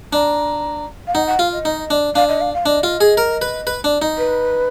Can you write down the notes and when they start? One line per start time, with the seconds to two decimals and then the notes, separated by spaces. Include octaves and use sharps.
0.13 D4 A#5
1.07 F5
1.14 D#4 F#5
1.27 F#5
1.39 F4 F5
1.52 D#5
1.65 D#4
1.90 D4
2.15 D4 F5
2.29 D#5
2.41 F5
2.54 F5
2.66 D4 D#5
2.83 F4
3.01 G#4
3.17 A#4
3.42 B4
3.67 B4
3.84 D4
4.02 D#4
4.18 B4